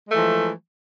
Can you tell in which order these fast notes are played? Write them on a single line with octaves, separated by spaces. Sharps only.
G#3 A3 E3 F3